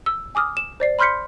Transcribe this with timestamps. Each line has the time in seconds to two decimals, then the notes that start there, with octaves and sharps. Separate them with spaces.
0.06 E6
0.35 G#5 D6 D#6 F6
0.57 E7
0.80 C5 D5 C7
0.99 B5 C6 F6 G6 B6 C#7